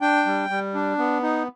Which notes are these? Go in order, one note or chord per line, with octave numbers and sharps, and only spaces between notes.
D4 G5
G3
G3
D4
B3
D#4